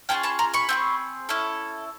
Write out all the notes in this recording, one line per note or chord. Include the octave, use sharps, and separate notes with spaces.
C#4 F4 G#4 G5 A5
A5 B5
A#5 C6
B5 C#6
C4 F4 G#4
C#4 E4 A4